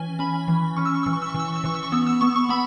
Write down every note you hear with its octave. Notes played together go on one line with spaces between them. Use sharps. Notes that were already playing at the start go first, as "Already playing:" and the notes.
Already playing: E3 C#4 G#5
C#4 B5
E3
C#4 C#6
E6
C#6
E3 E6
C#6
E6
C#6
E3
E6
C#6
E6
E3 C#6
E6
C#6
B3 E6
E6
B3 C#6
C#6
B3 B5